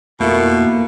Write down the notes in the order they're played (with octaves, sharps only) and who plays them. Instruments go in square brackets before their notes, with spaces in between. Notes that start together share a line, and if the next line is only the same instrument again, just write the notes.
[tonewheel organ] F2 [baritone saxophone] B2 [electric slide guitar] A3 E4 F4 [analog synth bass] A#3